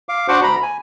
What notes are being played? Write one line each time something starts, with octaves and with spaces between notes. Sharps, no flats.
F5 D6
D4 F#4 C5 F#5 D6
D2 A#5 B5
G#5